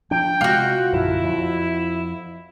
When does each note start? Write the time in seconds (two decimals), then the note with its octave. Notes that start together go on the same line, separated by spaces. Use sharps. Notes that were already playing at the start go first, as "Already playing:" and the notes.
0.11 F3 D4 G5
0.41 C3 G#3 F4 F#4
0.92 A#1 F#2 D3 E4
1.23 F2